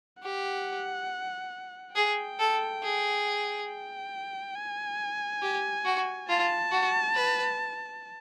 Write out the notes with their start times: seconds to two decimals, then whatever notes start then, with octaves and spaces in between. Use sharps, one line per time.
0.23 G4 F#5
1.95 G#4 G5
2.39 A4
2.83 G#4
3.68 G5
4.55 G#5
5.42 G4
5.85 F#4
6.29 F4 A5
6.71 F#4
7.15 B4